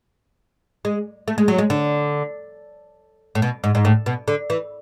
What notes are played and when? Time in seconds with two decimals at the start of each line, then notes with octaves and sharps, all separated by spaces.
0.85 G#3
1.28 A3
1.38 G#3
1.48 F#3
1.58 G#3
1.70 D3
3.35 A2
3.42 B2
3.64 G#2
3.75 G#2
3.85 A2
4.06 B2
4.28 D3
4.50 E3